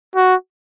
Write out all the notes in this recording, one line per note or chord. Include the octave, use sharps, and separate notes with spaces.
F#4